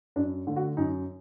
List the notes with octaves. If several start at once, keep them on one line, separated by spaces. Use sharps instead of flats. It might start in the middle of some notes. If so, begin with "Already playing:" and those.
F#2 D4
D3 A3
F#4
F#2 D#4